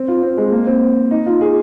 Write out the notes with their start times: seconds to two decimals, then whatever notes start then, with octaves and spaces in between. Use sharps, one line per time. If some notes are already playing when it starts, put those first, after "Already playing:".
Already playing: C4
0.08 F4
0.22 C4
0.37 G#3
0.52 A#3
0.67 C4
1.11 D#4
1.26 F4
1.41 G#4